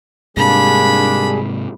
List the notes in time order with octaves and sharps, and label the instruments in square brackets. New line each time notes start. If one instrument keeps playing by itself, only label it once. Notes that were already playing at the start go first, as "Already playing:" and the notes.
[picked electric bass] G#2 C3 G#3 [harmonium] G3 G#4 [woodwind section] A#3 D4 [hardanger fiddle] B5